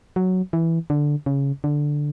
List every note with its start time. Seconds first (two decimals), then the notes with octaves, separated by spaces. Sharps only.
0.16 F#3
0.53 E3
0.90 D3
1.26 C#3
1.64 D3